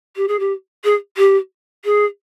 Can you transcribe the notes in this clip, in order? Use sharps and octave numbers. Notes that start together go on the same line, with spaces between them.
G4
G#4
G4
G#4
G4
G#4